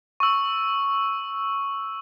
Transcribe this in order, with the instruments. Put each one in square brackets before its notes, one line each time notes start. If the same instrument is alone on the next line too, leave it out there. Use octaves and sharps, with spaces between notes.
[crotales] C#6 E6